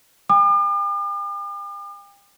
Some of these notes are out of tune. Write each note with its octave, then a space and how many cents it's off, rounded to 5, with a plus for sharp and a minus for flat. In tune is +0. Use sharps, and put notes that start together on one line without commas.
G5 +40 D6 +45